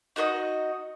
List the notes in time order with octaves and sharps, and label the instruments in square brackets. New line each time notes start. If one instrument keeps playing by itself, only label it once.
[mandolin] D#4 F#4 C#5 D#5